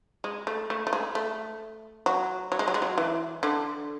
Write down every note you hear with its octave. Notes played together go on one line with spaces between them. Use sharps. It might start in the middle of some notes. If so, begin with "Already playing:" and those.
G#3
A3
A3
A3
G#3
A3
F#3
F#3
G#3
F#3
G#3
F#3
E3
D3